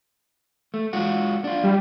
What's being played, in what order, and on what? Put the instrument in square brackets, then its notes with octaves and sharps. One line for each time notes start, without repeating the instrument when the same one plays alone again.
[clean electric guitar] A3
G#3 F4 F#4
D4 F4
[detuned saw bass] G3